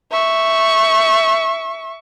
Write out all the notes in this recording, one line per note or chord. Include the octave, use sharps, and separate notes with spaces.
E5 C#6